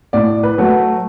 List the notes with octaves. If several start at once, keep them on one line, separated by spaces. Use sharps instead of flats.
A2 D5
B4
F#3 A3